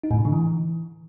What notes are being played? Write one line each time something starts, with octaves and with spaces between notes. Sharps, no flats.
D#4
A2
C3
D3
E3